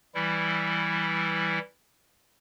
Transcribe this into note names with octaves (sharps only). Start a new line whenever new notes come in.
E3 G3 E4